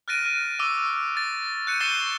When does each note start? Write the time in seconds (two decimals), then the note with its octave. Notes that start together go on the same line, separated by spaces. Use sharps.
0.08 F6 F#6 A6 A#6 D7 D#7
0.26 F6
0.59 C#6 D6 E6 D#7
1.17 A6
1.67 F#6 G6 C#7 D#7
1.80 C#6 A6 C7 E7 G7